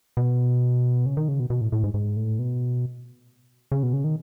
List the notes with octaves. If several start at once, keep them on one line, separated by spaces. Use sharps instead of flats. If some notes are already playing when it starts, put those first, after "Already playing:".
B2
C#3
D#3
C#3
B2
B2
A2
A2
G#2
G#2
A2
B2
C#3
B2
C#3
D#3